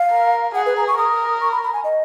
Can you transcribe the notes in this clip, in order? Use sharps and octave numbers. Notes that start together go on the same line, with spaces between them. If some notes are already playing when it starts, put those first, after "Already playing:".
Already playing: F5
A#4
G#4 F#5
B4
A#5
C#6
A#4 D#6
C#6
B5
B5
G#5
D#5